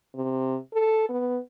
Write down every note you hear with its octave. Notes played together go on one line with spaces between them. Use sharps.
C3
A4
B3